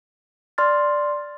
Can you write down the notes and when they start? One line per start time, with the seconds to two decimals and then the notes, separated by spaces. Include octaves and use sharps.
0.58 D5 C6 F6 A6